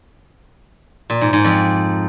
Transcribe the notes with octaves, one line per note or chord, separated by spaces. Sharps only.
A#2
G#2
G#2
F2